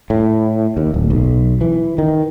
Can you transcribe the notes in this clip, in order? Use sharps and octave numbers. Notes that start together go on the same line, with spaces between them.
A2
D#2
D1
B1
E3
D#3